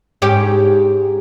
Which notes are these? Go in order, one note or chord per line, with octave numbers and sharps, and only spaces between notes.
G#2 C#4 G4